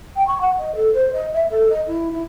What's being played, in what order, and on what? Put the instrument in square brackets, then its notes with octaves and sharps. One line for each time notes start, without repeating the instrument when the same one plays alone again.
[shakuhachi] G5
C#6
F#5
D#5
A4
C5
D#5
E5
A4
D#5
E4
E4